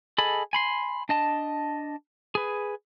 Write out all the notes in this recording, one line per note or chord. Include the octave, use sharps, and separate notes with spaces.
G#4 A4 D#5 B5
G#5 B5 C6
D4 D#5 A5
G#4 B4